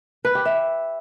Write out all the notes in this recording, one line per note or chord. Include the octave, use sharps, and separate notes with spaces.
B4
G4
E5